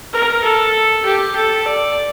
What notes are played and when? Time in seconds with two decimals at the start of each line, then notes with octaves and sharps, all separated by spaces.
0.13 A#4
0.44 A4
1.05 G4
1.36 A4
1.66 D5